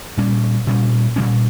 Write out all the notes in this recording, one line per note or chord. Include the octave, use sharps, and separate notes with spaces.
A#2 G3 C#4
A#2 G3 C#4
A#2 G3 C#4